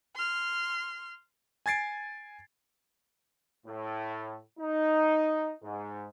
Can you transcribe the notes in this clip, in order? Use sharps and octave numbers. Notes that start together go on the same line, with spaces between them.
C6 F6
G#5 G#6 A6 C7 D7
A2
D#4
G#2